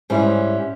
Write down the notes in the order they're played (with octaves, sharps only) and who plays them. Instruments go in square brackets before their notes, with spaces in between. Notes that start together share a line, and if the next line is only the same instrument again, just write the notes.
[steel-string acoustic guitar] G#2 G3 C#4 E4